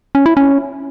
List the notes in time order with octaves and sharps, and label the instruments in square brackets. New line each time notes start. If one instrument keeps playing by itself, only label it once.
[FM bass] C#4
E4
C#4